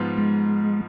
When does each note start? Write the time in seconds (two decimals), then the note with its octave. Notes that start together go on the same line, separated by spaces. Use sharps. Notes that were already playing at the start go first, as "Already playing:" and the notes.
Already playing: G#2 F3 B3 F4
0.18 G#3